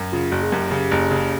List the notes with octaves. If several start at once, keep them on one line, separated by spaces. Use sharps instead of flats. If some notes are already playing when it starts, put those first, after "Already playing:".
Already playing: F#2
C#3 F4
F#1 F#4
G#4
F#2 G4
C#3
F#1
C#3